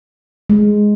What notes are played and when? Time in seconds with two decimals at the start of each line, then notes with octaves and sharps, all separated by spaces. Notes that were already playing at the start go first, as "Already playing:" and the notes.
0.50 G#3